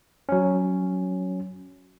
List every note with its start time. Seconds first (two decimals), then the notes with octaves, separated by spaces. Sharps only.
0.29 F#3 C#4